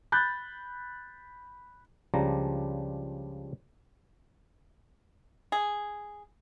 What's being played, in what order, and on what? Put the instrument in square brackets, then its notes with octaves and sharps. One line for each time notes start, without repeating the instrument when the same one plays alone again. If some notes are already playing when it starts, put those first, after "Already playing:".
[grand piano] B5 F#6 G6 A6
[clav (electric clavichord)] C#2 C#3 F3 G3 D4 A#5
[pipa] G#4